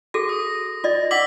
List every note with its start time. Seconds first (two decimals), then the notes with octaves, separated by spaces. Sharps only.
0.14 F#4 G#4 A4 A#6
0.29 D#6
0.84 F4 D5 D#5
1.11 F#5 D6 E6 B6 F#7